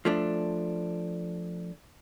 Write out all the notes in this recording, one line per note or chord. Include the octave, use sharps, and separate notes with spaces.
F3 A3 D4